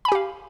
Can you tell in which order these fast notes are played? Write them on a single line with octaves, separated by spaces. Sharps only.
B5 G#5 G4 F5